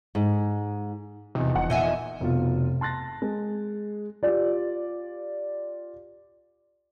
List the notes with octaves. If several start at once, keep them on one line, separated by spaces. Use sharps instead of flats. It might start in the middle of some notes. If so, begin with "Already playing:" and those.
G#2
E2 C3 F3 D#4
E1 F#5
A#2 D#5 E5 G#5
F1 B2 F4
A5 C6 F#6 A6 A#6
G#3
F4 G4 D5